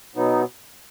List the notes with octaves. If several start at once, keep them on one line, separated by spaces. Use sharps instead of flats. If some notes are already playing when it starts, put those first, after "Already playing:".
B2 F#3 B3 D#4